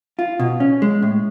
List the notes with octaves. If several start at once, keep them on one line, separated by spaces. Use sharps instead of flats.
F4
B2
C#4
G#3
A2